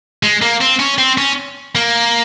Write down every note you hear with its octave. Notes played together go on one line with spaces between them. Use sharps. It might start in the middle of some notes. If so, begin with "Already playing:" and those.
G#3
A#3
C4
C#4
C4
C#4
A#3